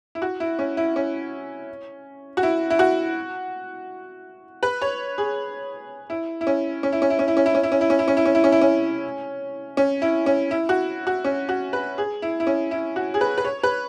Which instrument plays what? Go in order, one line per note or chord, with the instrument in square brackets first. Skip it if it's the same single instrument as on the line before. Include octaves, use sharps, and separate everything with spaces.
[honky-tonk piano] E4
F#4
E4
C#4
E4
C#4
F#4
E4
E4
F#4
B4
C#5
G#4
E4
E4
C#4
C#4
E4
C#4
E4
C#4
E4
C#4
E4
C#4
E4
C#4
E4
C#4
E4
C#4
E4
C#4
E4
C#4
E4
C#4
C#4
E4
C#4
E4
F#4
F#4
C#4
F#4
B4
G#4
E4
E4
C#4
E4
F#4
G#4
B4
B4
C#5
B4